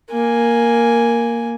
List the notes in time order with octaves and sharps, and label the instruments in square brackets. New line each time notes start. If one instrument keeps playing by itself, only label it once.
[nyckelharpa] A#3 G#5